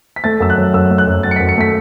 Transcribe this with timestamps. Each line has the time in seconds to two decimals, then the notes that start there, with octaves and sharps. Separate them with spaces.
0.16 B6
0.24 A3 A6
0.40 F#2 E6
0.50 F#6
0.58 F#3
0.74 F#2 E6
0.91 A3
0.98 F#6
1.07 F#2
1.23 F#3 A6
1.31 C#7
1.36 F#2 B6
1.49 C#7
1.58 A3 B6